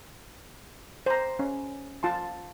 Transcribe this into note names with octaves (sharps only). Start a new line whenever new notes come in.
C5 A#5
C#4
F4 A5 C6